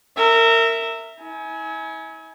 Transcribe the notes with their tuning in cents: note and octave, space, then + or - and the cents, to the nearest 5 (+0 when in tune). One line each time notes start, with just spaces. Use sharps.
A#4 -25 E5 +0
E4 -40 G#5 +15